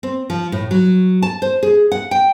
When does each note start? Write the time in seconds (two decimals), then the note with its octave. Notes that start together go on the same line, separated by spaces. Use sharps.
0.03 C4
0.30 F3
0.52 A2
0.71 F#3
1.23 A5
1.42 C5
1.63 G#4
1.92 F#5
2.11 G5